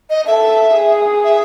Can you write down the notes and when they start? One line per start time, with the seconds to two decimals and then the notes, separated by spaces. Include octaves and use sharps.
0.10 D#5
0.27 A4 E5
0.75 G#4
1.24 E5